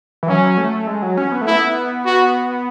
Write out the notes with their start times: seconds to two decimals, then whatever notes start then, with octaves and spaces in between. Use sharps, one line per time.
0.23 E3
0.28 F#3 C#4
0.57 A3
0.87 G#3
1.02 F#3
1.17 C#4
1.32 B3
1.41 A3
1.47 B3 E4
2.05 F#4